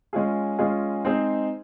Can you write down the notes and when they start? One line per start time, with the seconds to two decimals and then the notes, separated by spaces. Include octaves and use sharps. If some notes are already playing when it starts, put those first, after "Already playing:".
0.13 G#3 C#4 F4 G#4
0.58 G#3 C#4 F4 G#4
1.05 G#3 C4 D#4 G#4 C5